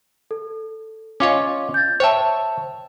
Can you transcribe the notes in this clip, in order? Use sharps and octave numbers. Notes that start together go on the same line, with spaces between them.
A4
C#4 F4 C#5 D#5 D6
G6 A6
C5 C#5 E5 G5 A5